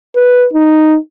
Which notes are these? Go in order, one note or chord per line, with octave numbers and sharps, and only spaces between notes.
B4
D#4